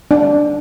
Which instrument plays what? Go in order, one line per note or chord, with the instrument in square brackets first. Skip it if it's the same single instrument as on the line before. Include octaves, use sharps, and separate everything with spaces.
[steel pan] D4